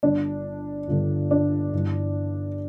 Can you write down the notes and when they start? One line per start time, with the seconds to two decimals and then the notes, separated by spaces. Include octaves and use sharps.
0.03 G1 G2 D3 D4
0.88 G1 G2 D3
1.31 D4
1.73 G1 G2 E3